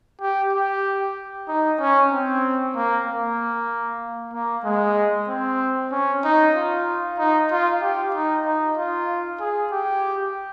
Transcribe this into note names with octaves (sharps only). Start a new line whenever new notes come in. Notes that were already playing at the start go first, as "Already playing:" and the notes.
G4
G4
D#4
C#4
C4
A#3
A#3
A#3
G#3
C4
C#4
D#4
F4
D#4
F4
G4
D#4
D#4
F4
G#4
G4